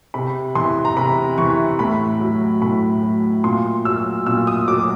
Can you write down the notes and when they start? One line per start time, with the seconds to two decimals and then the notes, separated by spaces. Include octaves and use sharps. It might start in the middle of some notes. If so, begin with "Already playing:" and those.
0.14 C3 B5
0.55 E3 C6
0.85 A#5
0.96 C3 B5
1.38 E3 C#6
1.79 A2 B5
2.20 F#3
2.62 A2 B5
3.03 F#3
3.44 A#2 C6
3.85 F#3 E6
4.26 A#2 E6
4.47 D#6
4.68 F#3 D6